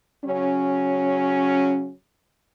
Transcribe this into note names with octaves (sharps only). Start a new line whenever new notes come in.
C#3 F#3 C#4